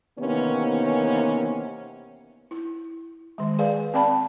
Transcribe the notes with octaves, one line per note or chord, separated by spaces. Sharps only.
C3 D#3 E3 A#3 B3 C#4
E4
D#3 G#3
G#4 B4 D5 F5 G#5
C4 D5 F5 G5 A5 B5